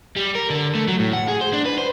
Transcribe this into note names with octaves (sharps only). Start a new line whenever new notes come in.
G3
A#4
D3
A3
F#3
A2
F#5
G#4
C5
D4
B4
C5